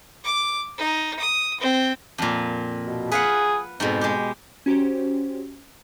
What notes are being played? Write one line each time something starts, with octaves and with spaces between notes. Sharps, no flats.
D6
D#4
D#6
C4
F2 A#2
B2
G#4 B4 F5 F#5
F2 G#2 B2
G#3 G4
C#4 F#4 G4 C5